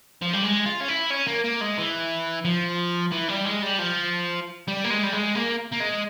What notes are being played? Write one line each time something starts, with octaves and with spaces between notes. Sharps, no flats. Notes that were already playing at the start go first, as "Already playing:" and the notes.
F3
G3
G#3
F4
C#4
E4
C#4
A#3
A#3
G#3
E3
F3
E3
G3
G#3
G3
F3
G3
A#3
G#3
G3
G#3
A#3
A#3
G#3